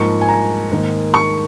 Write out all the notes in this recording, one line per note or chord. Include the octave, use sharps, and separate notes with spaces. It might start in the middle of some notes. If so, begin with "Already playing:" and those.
Already playing: G#2 F3 A#3 C#6
G#5
A#5
G#2 D#3 A#3
C#6